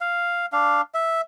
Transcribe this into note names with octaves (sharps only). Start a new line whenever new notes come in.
F5
D4 F5
E5